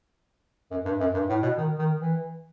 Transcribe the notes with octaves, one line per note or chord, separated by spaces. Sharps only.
F#2
G2
F#2
G2
A2
B2
D#3
D#3
E3